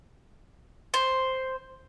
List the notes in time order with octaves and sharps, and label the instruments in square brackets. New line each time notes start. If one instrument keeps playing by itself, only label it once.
[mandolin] C5